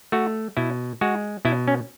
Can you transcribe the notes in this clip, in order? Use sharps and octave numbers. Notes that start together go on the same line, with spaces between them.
A3 F#4
B2 E4
G#3 F#4
B2 E4
C#4